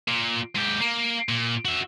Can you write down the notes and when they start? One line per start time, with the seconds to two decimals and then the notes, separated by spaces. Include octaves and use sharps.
0.08 A#2
0.55 G#2 G4
0.81 A#3
1.29 A#2
1.65 F#4 E5